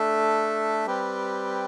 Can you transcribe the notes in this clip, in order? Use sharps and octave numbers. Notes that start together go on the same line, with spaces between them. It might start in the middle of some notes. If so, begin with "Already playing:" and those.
Already playing: A3 D4 A4 E5
G3 C4 G4 B4